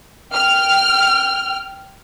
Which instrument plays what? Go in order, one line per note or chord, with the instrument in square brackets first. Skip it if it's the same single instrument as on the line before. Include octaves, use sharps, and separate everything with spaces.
[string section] G5 F6